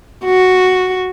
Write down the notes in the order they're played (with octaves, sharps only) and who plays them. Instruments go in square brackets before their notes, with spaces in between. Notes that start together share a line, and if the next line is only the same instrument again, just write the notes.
[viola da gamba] F#4